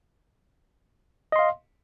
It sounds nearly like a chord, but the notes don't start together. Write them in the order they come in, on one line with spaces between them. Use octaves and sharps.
D#5 C6 F5